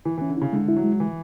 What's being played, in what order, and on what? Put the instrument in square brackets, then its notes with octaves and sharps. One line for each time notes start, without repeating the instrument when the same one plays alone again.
[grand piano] E3 [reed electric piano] E4
[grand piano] E3 [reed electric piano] C#4
[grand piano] D3
[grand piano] C#3 [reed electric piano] E4
[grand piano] D3 [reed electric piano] G#3
[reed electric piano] E4
[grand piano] F#3
[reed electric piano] G#3
[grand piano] E3